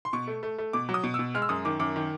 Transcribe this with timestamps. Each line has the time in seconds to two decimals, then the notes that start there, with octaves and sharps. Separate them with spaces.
0.05 C6
0.13 B2 C#6
0.27 A3
0.43 A3
0.58 A3
0.73 B2 D6
0.89 F#3
0.94 D#6
1.04 B2
1.14 B2 E6
1.34 G#3 F6
1.42 E6
1.49 F#2 D#6
1.65 D#3 D6
1.80 F#2 D6
1.96 D#3